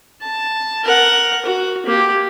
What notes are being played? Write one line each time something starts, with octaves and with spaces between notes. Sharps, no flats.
A5
A#4 F#5
F#4
A#3 G4